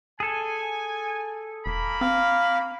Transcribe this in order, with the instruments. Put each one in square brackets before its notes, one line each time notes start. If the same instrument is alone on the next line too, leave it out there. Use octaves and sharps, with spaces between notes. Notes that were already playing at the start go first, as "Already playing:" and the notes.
[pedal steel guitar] G#4 A4 [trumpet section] G#5
[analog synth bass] E1 [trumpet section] A#3 B5
[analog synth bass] C4 [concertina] F5